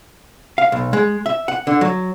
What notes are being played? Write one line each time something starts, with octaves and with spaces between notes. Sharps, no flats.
F5
B1
G#3
E5
F#5
D3
F#3